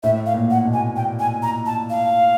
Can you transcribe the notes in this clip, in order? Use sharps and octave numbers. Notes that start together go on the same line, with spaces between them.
A2 E5
F5
A#2
F#5
B2
G#5
G5
G#5
A#5
A5
F5